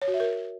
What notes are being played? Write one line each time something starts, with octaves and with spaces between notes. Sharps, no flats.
C#5
F#4
E5
A#4